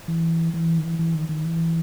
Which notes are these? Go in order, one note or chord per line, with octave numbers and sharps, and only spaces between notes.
E3
E3
D#3
E3
E3
D#3
D#3
E3